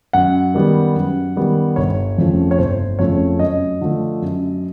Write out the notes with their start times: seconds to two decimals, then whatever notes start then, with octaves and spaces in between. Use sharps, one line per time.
0.13 F#2 F#5
0.54 D#3 G3 B3
0.95 F#2
1.36 D#3 G3 B3
1.76 G1 C#5
2.18 F2 C#3 F3 A3
2.51 C#5
2.58 G1 C5
2.99 F2 C#3 F3 A3 C#5
3.39 F#2 D#5
3.81 D3 F3 A3
4.22 F#2